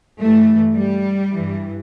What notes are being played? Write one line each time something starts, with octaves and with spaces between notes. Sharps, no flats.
G2 E3 A3
G3
G2 E3